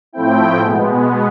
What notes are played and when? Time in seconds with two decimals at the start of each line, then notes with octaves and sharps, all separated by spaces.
0.13 A2 F3 A3 C4 E4 G5
0.59 B2 G#3 B3